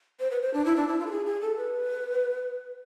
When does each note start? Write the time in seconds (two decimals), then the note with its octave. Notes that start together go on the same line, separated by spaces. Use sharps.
0.20 C5
0.31 B4
0.42 C5
0.54 D4
0.66 E4
0.76 D4
0.88 E4
1.00 F4
1.06 A4
1.11 G#4
1.26 G#4
1.41 A4
1.57 B4